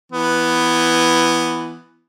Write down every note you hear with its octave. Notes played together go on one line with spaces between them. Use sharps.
E3 B3